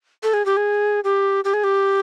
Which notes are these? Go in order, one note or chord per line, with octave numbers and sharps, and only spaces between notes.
A4
G#4
G4
G#4
G4
G4
G#4
G4